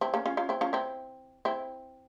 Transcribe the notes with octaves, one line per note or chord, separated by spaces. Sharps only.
C4 E4
A#3 C#4
C#4 F4
C#4 F4
C4 E4
C#4 F4
C4 E4
C4 E4